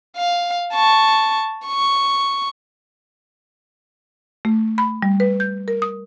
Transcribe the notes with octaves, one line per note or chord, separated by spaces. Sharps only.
F5
A5 C#6
C#6
A3
B5
G3
B4
G6
A#4
D#6